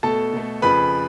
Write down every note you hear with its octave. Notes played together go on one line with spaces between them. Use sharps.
B2 A3 A4 A5
B2 A3
F2 C#3 F3 B4 B5